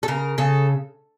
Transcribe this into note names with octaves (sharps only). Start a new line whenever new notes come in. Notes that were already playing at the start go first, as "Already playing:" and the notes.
A4
C#3 A#4
C#3 A4